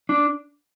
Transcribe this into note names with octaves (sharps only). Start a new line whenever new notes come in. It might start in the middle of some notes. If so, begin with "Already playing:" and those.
D4